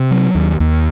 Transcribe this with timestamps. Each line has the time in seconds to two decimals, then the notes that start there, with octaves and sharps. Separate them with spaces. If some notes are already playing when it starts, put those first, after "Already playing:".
Already playing: C3
0.11 F#3
0.35 D#2
0.60 D#2